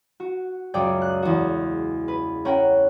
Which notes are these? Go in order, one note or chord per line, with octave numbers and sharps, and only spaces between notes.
F#4
C#2 F#2 G#4 D5 G5
F#6
E2 F#4
B4
C#4 A#4 F#5 G5